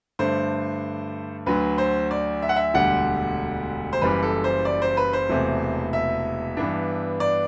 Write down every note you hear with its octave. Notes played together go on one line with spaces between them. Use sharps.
G2 D3 A3 C5
D2 D3 F#3 B4
C5
D5
E5
F#5
E5
E1 D2 D3 G3 F#5
C5
F#1 F#2 E3 G3 B4
A4
C5
D5
C5
B4
C5
E1 E2 C3 E3 A3
E5
G2 E3 B3 D4
D5